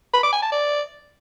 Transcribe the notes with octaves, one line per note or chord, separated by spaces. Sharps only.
B5
D6
G#5
A5
D5